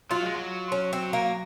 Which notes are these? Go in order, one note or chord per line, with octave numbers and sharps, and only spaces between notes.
F#3 F4
G#3
F#3
C#4
C4
A#3